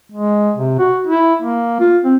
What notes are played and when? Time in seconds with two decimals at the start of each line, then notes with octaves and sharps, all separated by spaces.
0.12 G#3
0.57 C3
0.79 F#4
1.07 E4
1.42 A#3
1.80 F4
2.04 C4